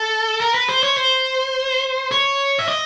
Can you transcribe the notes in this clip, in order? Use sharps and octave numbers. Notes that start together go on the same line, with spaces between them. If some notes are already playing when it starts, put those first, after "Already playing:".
Already playing: A4
A#4
B4
C5
C#5
C5
C#5
E5
D#5